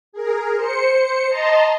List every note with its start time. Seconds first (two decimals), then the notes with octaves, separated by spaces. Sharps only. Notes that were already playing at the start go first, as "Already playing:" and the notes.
0.13 G#4 A#4
0.55 C5 C#7
1.29 D#5 A5 A#5 C6